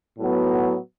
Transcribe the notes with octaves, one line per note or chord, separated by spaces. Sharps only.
A2 F#3 B3